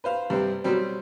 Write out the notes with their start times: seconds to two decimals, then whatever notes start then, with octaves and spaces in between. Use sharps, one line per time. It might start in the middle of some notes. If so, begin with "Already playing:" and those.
0.04 B4 C5 F5
0.30 G2 C3 B3 C4
0.64 B2 F#3 G3 C4